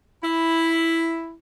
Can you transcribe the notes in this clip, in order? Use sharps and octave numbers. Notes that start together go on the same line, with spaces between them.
E4